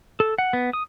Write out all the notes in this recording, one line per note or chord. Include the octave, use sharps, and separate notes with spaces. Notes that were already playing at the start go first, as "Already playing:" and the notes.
A4
F#5
B3
D#6